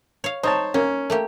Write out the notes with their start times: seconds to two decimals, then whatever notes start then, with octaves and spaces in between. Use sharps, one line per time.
0.24 C#5 F5
0.43 D#4 C5 C#5 A5
0.74 A#3 C#4
1.10 A3 A#3 G4